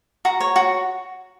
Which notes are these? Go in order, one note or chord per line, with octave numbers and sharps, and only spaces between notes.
F#4 A#5
C#5
F#4